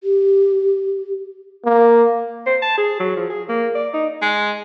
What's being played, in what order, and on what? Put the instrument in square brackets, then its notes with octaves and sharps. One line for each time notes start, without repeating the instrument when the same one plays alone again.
[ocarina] G4
[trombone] A#3
[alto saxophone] C5
A5
G#4
F#3
F3
G#4
A#3
D5
D#4
[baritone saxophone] G#3